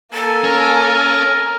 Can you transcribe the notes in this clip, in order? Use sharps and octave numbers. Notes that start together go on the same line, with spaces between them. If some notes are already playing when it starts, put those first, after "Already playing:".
A#3 A4 G#5
C#4 A#4